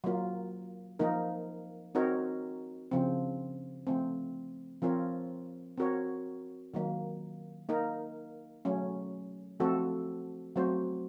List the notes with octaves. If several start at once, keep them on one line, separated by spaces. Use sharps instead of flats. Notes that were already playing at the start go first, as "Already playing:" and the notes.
F#3 A#3 F4
F3 A#3 D#4 A#4
C4 D#4 F#4 A#4 C#5
C#3 F3 C4
F3 A3 C4
F3 C4 F4 A#4 C#5
C4 F#4 A#4 C#5
D#3 F#3 A#3
A#3 D#4 A#4
F#3 A3 C#4
F3 A3 C4 F#4 A4
F#3 A3 C4 F#4 C5